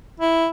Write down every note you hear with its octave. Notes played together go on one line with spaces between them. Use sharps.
E4